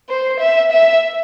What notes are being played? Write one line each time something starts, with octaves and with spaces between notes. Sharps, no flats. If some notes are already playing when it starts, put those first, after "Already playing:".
C5
E5
E5